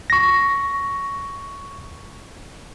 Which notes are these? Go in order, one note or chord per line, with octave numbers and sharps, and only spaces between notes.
C#6 A#6